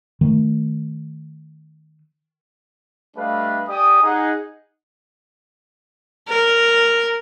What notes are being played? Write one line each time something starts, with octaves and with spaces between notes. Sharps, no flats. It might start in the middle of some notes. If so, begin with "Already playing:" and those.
D#3 A3
G3 A3 D4 B4 D#5 F5
G4 D5 G#5 D#6
D#4 G#4 F#5
A#4